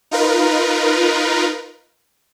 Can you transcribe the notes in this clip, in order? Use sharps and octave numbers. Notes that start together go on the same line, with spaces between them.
D#4 F4 A#4 B4